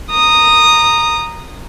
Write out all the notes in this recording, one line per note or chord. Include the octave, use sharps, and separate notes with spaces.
A#5 D#6